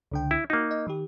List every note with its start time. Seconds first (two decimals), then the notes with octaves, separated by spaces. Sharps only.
0.11 C#2 D3 G5
0.31 E4
0.50 A#3 D#4 F#4
0.71 D#5
0.88 D#3 G4